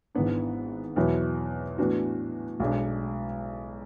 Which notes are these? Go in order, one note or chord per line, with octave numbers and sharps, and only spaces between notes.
G#1 G#2 E3 B3 D4
E2 B2 F#3 B3 E4
A2 E3 B3 D4 F#4
B1 B2 G#3 D4